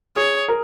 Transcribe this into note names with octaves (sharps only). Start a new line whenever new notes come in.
G#4 C#5
A#4